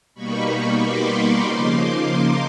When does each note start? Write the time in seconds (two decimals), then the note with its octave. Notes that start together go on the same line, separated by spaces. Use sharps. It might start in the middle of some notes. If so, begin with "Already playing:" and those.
0.15 B2 G3 A#3 D#4 B5 C#6
0.78 C6 D6
1.42 C#3 F3 A#3 D#4